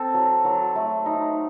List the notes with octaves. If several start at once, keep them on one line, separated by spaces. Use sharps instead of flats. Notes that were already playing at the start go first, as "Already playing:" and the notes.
Already playing: C4 A4
F#3
F#3
A3
D#4